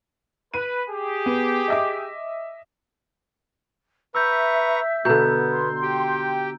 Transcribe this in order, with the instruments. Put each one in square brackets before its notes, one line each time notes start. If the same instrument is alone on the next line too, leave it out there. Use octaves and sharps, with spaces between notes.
[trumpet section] B4 [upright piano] D#7
[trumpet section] G4 G#4
[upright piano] B3
D#5 E5 D6
[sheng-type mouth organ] B4 A#5 C#6 [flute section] E5 [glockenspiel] E6 G6
[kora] B2 D3 [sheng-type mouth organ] B3 [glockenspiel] A#5 G6
[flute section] C6
[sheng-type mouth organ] G4 G5